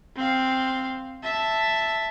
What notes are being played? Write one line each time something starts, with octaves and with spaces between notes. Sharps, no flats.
C4 F5
E5 A5